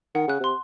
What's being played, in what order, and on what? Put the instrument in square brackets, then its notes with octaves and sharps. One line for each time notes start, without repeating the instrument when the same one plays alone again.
[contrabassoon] D#3 [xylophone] F#5
[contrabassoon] C#3 [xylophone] F#6
[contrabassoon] C3 [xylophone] C6